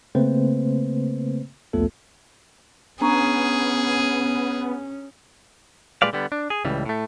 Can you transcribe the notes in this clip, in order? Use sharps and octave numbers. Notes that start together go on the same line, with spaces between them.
C#3 A3 A#3 C4 B4 C5
A#1 D#2 A3 B3 F4 A4
B3 C#4 D4 G#4 A#5 C#6
A#2 G3 G#3 B4 D5 F5
D3 G3 B3
D4
G#4
C#2 A2 C#3 E3 G3
A2 A3